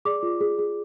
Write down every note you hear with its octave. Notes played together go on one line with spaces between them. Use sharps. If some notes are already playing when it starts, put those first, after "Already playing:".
G#4 D5 D6
F4
G#4
G#4